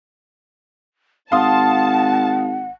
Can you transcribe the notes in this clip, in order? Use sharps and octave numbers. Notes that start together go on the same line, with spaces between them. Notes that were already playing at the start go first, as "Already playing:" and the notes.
G#1 F5 F#5 A5 C6 D#6